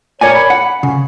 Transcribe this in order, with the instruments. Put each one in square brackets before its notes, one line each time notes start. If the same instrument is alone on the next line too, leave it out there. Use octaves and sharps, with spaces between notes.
[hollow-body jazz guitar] A#4 D5 G#5 [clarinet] C#5
[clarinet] B5
[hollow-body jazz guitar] F#5
C#3